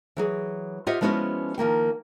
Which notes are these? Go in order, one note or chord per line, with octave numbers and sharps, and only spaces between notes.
E3 F#3 G#4
F4 G4 C5 D#5 E5 F#5
F3 G#3 B3 C#4 E4 F#4
D#3 F3 A#3 G5